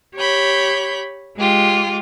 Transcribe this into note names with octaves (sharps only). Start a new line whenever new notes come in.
G4 C#5 B5 G6
G#3 F4 G4